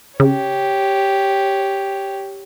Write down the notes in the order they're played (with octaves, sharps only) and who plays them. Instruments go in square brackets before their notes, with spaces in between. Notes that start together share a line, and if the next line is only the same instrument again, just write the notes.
[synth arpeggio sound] C#3 [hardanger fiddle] G4 C#5